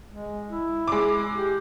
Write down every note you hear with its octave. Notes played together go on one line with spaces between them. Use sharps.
G#3
E4
G#3 D6
G4